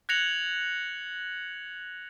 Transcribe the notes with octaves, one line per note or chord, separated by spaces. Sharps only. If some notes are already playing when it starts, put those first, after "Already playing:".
F#6 G#6 A#6 C#7 F7 F#7